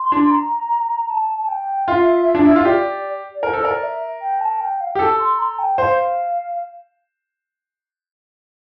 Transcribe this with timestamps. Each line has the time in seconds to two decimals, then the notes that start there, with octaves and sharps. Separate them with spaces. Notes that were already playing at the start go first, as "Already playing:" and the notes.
Already playing: C6
0.12 D4
0.31 A#5
1.10 A5
1.38 A5
1.48 G5
1.88 F4 E5
2.35 D4
2.45 E4
2.56 F4
2.65 G4 D5
3.35 D5
3.43 A#4 C5
3.53 A4
3.62 A#4 D5
3.83 E5
4.21 G5
4.40 A5
4.60 G5
4.80 F5
4.92 G5
4.95 G4
4.99 A4 A5
5.18 C6
5.39 A#5
5.59 G5
5.77 C5 F5